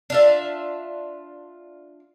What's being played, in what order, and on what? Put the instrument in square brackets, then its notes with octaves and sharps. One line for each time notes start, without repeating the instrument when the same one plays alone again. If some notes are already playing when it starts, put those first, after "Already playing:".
[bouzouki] D4 F4 E5